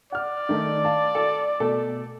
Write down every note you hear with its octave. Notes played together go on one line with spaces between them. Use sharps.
D5 F#5 F6
D#3 A3 D#4
F5 A5
A4
B2 A3 A4